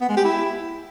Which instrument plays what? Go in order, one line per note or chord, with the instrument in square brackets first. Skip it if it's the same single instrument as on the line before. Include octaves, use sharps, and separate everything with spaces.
[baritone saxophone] B3
G#3
G4
E4